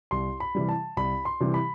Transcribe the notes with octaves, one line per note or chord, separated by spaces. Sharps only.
C2 C6
B5
C3 E3 G3
A5
C2 B5
C6
C3 E3 G3
B5